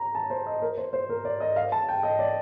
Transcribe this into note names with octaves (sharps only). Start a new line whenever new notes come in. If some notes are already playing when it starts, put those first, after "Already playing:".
Already playing: A#5
A5
C5
D#5
A#4
C5
C5
A#4
D5
D#5
F5
A5
G5
D#5
D5